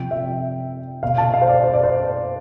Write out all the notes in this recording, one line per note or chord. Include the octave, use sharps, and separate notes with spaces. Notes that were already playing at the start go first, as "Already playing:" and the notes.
Already playing: C3 F3 G5
E5
B2 F5
A5
F5
C5
D5
C5
D5
C5